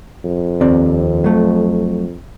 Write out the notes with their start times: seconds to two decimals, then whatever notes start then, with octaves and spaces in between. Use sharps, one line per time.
0.24 F2
0.61 D#2 C4 D5
1.24 F#3 A3